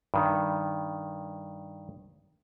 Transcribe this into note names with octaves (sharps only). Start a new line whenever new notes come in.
G2 D#3